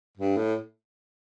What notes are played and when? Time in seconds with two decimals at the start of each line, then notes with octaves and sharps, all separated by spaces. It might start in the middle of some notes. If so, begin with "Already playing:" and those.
0.18 G2
0.37 A2